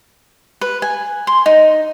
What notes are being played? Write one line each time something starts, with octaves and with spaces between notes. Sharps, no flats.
B4
G#5
C6
D#4